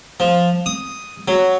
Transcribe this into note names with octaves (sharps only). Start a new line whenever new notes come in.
F3
D#6
F#3